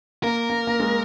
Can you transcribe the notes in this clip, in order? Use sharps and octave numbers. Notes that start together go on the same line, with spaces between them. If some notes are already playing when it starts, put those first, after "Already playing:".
A#3 A#4
A#3
A#3
G#3